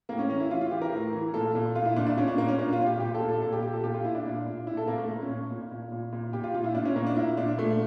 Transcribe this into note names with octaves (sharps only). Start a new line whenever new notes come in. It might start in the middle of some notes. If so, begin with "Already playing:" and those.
A2 A#3
C#4
E3 C#4
E4
E3 F4
F4
E3 G4
A#4
A2
E3
A#2 A4
A#2
A#2 F4
E4
A#2 D4
D4
A#2 C#4
D4
A#2 A#3
C#4
A#2 D4
F4
A#2
G4
A#2 G4
A4
A#2
A4
A#2 A4
G4
A#2 G4
A4
A#2 G4
F4
A#2 E4
D4
A#2
A#2
A#2 E4
A4
A#2 A#3
A3
A#2
C#4
A#2
A#2
A#2
A#2
A#2
A#2 G4
F4
A#2 F4
E4
A#2 D4
C#4
A#2 A#3
D4
A#2 E4
A#2 D4
A#2 A3